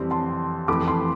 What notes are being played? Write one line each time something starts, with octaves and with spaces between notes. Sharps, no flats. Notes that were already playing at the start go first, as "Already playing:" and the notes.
Already playing: F2 E3 G3 C4 A5 C6
A5 C6
F2 E3 A3 B5 D6
A5 C6